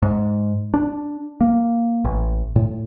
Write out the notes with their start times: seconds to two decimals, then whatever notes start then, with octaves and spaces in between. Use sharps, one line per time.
0.02 G#2
0.74 D4
1.41 A#3
2.05 A1
2.56 A2